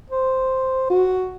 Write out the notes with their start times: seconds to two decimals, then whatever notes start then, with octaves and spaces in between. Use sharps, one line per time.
0.10 C5
0.90 F#4